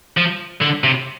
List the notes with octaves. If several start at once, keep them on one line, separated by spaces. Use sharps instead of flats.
F3
D3
C3